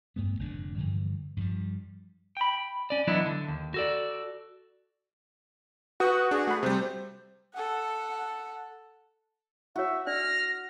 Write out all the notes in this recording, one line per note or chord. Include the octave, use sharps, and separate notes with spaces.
G2 A3 B3
F1 G#2 D3 D4
G2 D3 E3 F3
G2 F3 G3
G5 B5
C#4 D5
E3 F#3 B3 D4 E4 D#5
D3
D#2
F#4 A4 D5
F#4 B4 C#6 D#6 G6
D4 G#4
A3 B5
C3 G3 C5
A4 F#5
E4 F#4 C#5 E5
D4 D5 F6 A#6